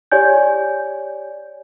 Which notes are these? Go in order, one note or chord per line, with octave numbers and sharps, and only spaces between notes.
G4 C#5 D5 G#5 G6